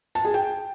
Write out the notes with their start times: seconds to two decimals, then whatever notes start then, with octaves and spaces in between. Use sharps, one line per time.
0.15 A5
0.25 G#4
0.34 G5